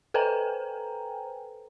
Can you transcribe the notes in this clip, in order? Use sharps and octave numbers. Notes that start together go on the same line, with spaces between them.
A4 B4 C5 G5 G#5 A#5